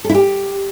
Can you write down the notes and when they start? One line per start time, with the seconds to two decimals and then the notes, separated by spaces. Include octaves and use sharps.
0.04 A4
0.09 E4
0.14 G4